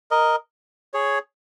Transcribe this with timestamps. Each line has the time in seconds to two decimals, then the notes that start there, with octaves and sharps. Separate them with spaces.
0.11 A#4 D#5
0.94 G#4 C#5